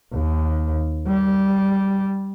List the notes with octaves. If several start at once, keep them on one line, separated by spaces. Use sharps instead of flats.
D#2
G3